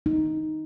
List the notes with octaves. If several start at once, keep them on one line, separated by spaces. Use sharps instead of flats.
D#4